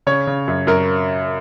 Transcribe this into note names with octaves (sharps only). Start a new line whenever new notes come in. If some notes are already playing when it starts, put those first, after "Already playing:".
C#3 C#5
C#3
F#2
F#2 A#4